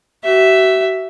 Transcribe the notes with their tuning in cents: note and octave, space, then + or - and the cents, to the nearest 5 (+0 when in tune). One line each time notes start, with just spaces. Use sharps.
F#4 +40 E5 +0